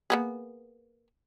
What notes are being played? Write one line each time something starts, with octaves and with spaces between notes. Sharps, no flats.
A#3 B3 G#4